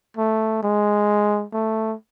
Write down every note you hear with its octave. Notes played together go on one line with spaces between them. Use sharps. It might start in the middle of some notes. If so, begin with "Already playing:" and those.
A3
G#3
A3